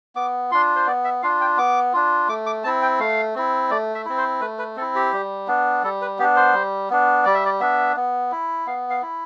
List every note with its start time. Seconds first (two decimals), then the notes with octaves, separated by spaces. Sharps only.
0.15 B3 D6
0.51 D4 F4 C6
0.76 C5
0.87 B3 D5
1.04 E5
1.22 D4 F4 F5
1.41 G5
1.58 B3 D6
1.93 D4 F4
2.28 A3 D6
2.46 D6
2.64 C4 E4 A5
2.82 G5
2.99 A3 F5
3.36 C4 E4
3.70 A3 D5
3.95 E5
4.05 C4 E4
4.17 C5
4.41 A3 B4
4.58 B4
4.76 C4 A4
4.81 E4
4.95 G4
5.13 G3
5.47 B3 D4
5.83 G3 A4
6.01 B4
6.19 B3 G4
6.22 D4
6.36 C5
6.53 G3
6.90 B3 D4
7.25 G3 D5
7.34 E5
7.45 D5
7.60 B3 D4 E5
7.96 B3
8.32 E4
8.67 B3 F5
8.90 F5
9.02 E4